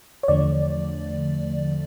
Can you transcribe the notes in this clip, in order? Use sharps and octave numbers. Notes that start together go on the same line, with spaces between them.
C#5
E2 D3 F3 A3 D5